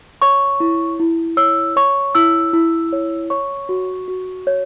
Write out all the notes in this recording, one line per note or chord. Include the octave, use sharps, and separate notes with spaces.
C#5 C#6
E4
E4
C#5 E6
C#5 C#6
E4 E6
E4
C#5
C#5 C#6
F#4
F#4
C#5